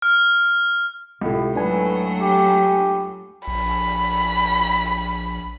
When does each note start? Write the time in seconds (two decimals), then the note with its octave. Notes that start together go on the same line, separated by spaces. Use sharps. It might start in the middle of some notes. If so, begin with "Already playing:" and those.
0.02 F6
1.21 C#2 A2 C3
1.55 F#3 A3 D4 B4 G#5
2.20 G4
3.48 A#1 B5